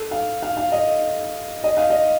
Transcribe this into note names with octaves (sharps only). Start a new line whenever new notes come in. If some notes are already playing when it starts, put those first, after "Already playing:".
Already playing: A4
F5
F5
F5
D#5
D#5
F5
D#5